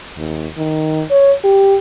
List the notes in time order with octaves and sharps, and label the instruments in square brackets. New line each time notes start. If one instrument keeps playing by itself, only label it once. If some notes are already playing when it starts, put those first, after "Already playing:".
[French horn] D#2
D#3
C#5
G4